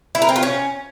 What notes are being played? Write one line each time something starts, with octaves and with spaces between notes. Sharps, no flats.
E4
A#4
C4
F4
C#4